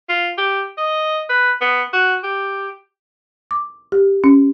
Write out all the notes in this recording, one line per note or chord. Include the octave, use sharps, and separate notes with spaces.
F4
G4
D#5
B4
B3
F#4
G4
D6
G4
C#4